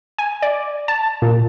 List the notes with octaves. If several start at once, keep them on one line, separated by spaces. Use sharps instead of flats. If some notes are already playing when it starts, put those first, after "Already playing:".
G#5
D5
A5
A#2